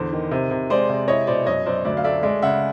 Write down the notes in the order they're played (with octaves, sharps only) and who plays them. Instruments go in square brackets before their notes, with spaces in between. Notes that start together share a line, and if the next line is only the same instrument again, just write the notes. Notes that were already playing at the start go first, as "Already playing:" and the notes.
Already playing: [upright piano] E2 D3 C5
D#3
C3
C3
G#3 C5 D5
C3
E4 C#5 D#5
B2 C5 D5
F#2 C#5 D#5
F#2 C5 D5
D2 D5 E5
F5
A3 D5 E5
G#3 D5 E5
C#3 E5 F#5